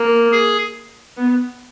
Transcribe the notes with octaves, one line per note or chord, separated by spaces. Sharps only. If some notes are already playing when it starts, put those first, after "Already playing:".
Already playing: A#3
G#4
B3